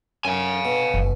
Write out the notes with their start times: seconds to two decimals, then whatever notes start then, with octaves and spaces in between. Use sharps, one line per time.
0.25 F#2 F5 G#5
0.65 B2
0.94 F#1 C2